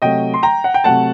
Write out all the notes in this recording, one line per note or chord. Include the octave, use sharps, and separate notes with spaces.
C3 F#3 A3 D#5 G5
C6
G5 A#5
F#5
G5
C3 F#3 A3 F#5 A5